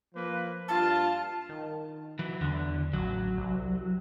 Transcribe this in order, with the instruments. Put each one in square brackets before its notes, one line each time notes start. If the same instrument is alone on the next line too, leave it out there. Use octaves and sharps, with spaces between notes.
[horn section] F3 A#3 B4
[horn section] G2 F4 [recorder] A5
[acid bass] D#3
[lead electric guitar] E3 F#3
[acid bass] E2 [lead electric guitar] D3
[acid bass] A1 [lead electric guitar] F#3
[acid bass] C2